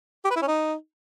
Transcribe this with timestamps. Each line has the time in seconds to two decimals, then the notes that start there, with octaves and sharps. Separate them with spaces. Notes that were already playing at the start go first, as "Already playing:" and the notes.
0.25 G4
0.30 B4
0.36 E4
0.42 C#4
0.48 D#4